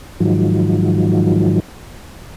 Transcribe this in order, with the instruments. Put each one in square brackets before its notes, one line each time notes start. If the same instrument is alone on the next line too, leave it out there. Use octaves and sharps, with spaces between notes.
[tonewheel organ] G#2 D#3 F3 F#3